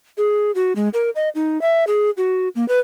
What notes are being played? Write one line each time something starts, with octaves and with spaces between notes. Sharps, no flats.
G#4
F#4
G#3
A#4
D#5
D#4
E5
G#4
F#4
A#3
B4